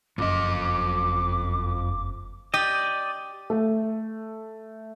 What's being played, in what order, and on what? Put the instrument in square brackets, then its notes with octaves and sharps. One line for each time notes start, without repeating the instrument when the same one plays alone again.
[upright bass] F#1 [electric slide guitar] F2 D#5 [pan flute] D6
[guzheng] G4 [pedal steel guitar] D5 D#5
[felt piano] A3